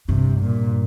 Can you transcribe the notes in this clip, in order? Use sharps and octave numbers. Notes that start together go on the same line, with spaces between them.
G2 C3
A#2